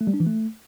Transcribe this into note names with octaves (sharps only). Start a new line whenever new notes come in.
A3
G3
D4
E3
A3